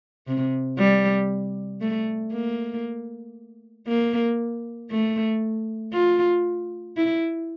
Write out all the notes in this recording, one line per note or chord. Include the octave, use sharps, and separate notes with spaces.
C3
G3
A3
A#3
A#3
A3
F4
E4